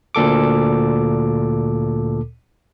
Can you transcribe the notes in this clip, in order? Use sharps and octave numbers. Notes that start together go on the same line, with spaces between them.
D2 A#2 A4 D6